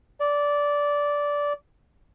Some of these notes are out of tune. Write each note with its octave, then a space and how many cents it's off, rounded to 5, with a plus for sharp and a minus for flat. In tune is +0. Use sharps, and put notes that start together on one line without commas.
D5 -15